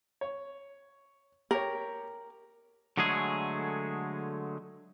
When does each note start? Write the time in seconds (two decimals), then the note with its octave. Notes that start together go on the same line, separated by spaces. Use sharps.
0.21 C#5
1.51 G4 A#4 C#5
2.97 D3 F#3 G#3 A3 G#4